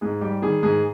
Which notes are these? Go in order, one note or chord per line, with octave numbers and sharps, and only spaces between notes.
G#2 G#4
G3 G4
D#3 G#4
G#2 G#4